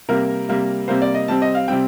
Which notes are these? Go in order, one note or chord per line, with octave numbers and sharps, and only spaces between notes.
C3 G3 A#3 A#4
C3 G3 A#3
C3 G3 A#3 C5
D5
D#5
C3 G3 C4 A5
D#5
F5
C3 G3 C4 G5